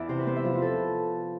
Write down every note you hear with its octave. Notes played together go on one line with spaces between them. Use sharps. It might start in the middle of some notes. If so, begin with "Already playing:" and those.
Already playing: E2 E3 D5 E5
C3 C5
B4
B3 C5
E5
F3 C5
B4
A4